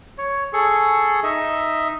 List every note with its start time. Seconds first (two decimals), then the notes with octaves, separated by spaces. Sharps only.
0.18 C#5
0.53 G#4 A4 C#6
1.23 D#4 D#5 E5